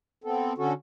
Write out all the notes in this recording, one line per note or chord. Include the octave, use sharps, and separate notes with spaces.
B3 C4 A4
D3 C#4 F#4 A4